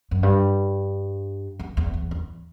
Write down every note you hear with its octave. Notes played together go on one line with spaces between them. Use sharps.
F#2
G2
E2
E2
E2
E2